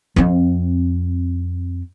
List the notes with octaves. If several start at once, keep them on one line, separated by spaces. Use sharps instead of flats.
F2 C4